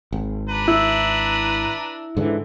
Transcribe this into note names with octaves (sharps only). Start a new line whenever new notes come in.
G#1
D4 B4 A#5
E4
G#2 D3 E3